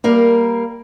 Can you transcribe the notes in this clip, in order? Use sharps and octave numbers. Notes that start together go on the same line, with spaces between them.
G3 A#3 A#4 F5